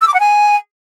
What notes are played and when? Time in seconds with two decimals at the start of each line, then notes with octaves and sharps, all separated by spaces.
0.01 E6
0.08 D6
0.14 F#5
0.20 G#5